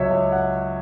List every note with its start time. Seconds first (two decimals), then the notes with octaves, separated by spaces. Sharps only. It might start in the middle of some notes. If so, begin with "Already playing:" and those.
Already playing: C#2 F#3 C#5 E5
0.11 C#2 E5
0.32 F#5